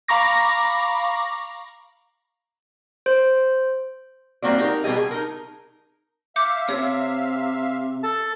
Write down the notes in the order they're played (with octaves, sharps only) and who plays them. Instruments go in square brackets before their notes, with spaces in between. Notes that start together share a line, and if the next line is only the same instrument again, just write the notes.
[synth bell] F5 A#5 B5 C#6 D6 A#6
[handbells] C5
[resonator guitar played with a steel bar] G3 A#3 C4 F#4 D5
D#4 G4 A#4
B2 G3 B3 G4 G#4 D#5
G#4
D#4 A#4
[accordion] E5 F5 [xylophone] D6 G6 C#7
[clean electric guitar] C3 [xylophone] C#5
[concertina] A4 A5